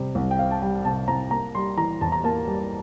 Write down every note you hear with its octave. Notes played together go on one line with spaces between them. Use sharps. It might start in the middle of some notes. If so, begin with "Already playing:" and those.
Already playing: C3 G3
C2
G5
C4 F5
A5
G3 G5
C3 A5
C2 A#5
A#3 A#5
G3 C6
E3 A#5
E2 A5
A#5
A#3 A5
G3